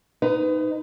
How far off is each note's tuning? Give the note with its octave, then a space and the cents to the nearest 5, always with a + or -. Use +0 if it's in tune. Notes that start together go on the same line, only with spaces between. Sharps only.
D#4 +0 B4 +35